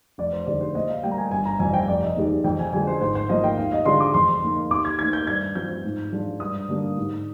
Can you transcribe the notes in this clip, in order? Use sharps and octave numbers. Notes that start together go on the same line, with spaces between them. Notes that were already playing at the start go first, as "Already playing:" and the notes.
F1 D5
C5
D#2 D3 G#3 D5
C5
A#2 D#5
F5
G3 A#3 G5
A#5
G#5
G1 G#5
A#5
F2 C3 G3 G#5
G5
F1 D5
D#5
D#2 D#3 G#3
F2 G5
G#5
D3 F3 G#3 G#5
C5
G#1 C5
C5
G#2 F3 A#3 D#5
G5
D#2 F5
D#5
D3 G#3 D4 F4 C6
D6
F2 C6
D#3 A#3
D#2 D6
G#6
D#3 A#3 G#6
G6
G2 G#6
F3 C4 G6
G#2
F3 G#3 D4 F4
G2 D#6
D3 G3 A#3 D4
G#2